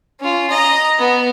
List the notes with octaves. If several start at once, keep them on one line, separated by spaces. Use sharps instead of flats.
C#4 F4
D#5 A#5
B3